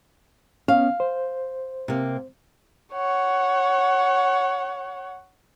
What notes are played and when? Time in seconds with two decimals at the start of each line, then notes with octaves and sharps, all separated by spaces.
0.68 B3 C#4 F5
1.00 C5
1.88 C3 A#3
2.93 C#5 F#5